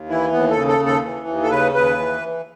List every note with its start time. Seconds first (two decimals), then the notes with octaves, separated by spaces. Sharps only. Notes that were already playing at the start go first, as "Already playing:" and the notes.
Already playing: D#2
0.09 E3 E4
0.32 D#2 B3
0.51 A4
0.56 C#3
0.68 A4
0.80 D#2
0.86 A4
1.03 E3
1.27 D#2
1.43 A4
1.50 C#3 B4
1.74 D#2 B4
1.98 E3